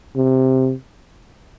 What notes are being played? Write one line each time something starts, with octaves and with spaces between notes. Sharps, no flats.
C3